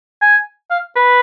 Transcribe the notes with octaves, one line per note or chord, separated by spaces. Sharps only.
G#5
F5
B4